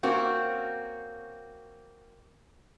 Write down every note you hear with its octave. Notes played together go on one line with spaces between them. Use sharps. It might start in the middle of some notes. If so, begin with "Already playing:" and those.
A#3 C4 C#4 F#4